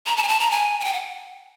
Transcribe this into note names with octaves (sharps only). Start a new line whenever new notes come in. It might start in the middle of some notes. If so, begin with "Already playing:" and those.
A#5
A5
G#5
A5
A#5
G#5
G#5
G5
F#5